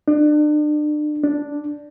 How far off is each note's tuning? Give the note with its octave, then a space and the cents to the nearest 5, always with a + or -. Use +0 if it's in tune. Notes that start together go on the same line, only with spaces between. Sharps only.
D4 +35
D4 +0